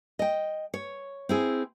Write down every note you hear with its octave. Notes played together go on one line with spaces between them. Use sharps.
D#5 G5
C#5
C4 E4 G#4